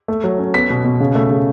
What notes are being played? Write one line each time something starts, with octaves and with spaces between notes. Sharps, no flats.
A3
F#3
C#4
B3 B6
B2
B2
C#3
A3
C#3